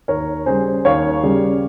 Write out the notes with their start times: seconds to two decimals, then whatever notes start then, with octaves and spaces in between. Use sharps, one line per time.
0.08 D#2 A#4 C#5
0.46 C#3 G3 G#4 C5
0.85 D#2 C#5 F5
1.23 C#3 G3